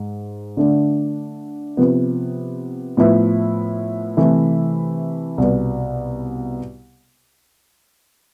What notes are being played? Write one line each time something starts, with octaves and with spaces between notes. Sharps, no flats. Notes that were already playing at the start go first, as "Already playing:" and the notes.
Already playing: G#2
D3 A3 D4
C3 F3 B3
A2 F3 B3 E4
C3 E3 A3 E4
C2 B2 B3